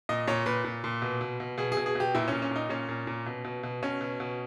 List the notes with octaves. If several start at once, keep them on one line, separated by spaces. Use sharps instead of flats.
A#2 D#5
A#2 C#5
A#2 B4
A#2
A#2
B2
B2
B2
B2 G#4
B2 G#4
G#4
B2 G4
A#2 E4
A#2 C#4
C#4
A#2 D#4
A#2 C#4
A#2
A#2
B2
B2
B2
B2 C#4
B2
B2